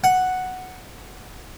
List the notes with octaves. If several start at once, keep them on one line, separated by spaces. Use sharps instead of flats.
F#5